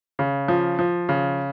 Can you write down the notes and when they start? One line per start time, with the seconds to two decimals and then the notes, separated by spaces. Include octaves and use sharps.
0.19 C#3
0.48 F3
0.79 F3
1.09 C#3